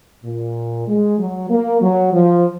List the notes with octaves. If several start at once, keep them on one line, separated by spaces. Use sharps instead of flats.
A#2
G#3
F#3
A#3
F#3
F3